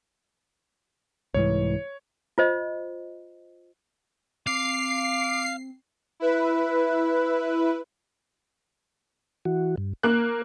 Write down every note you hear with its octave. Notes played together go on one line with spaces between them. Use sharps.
C2 G#2 E3 C#5
F4 C5 D#5
C4 F5 D6 C7
E4 B4
E3 F#4
G2
A#3 A#4 F#6